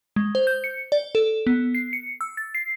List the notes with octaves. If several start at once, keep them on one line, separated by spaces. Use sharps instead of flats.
G#3
C5
G6
C#7
D5
A4
B3
C7
C#7
E6
A6
C7